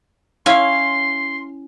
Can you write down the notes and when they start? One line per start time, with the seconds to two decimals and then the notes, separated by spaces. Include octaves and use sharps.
0.46 C#4 E4 F5 G#5 C6